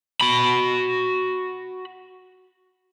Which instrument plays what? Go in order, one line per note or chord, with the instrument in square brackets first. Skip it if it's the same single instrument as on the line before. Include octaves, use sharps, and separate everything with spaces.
[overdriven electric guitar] F#4 B5